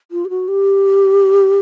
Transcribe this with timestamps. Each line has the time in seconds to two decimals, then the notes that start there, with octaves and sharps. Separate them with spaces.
0.11 F4
0.25 G4
0.30 F#4
0.48 G4